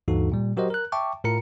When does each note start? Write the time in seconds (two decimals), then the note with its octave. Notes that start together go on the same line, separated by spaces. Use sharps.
0.08 D2 G2 E3 D#4 F#4 A4
0.32 A#2 G3
0.57 F#3 F#4 G4 A#4 C5 D#5
0.70 A#4 F#6
0.92 E5 G5 A5 C#6 D6
1.24 A2 F4 A#4 A#5 C#7